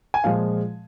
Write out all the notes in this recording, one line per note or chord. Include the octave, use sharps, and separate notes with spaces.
G#5
A#2 F3 G#3 F5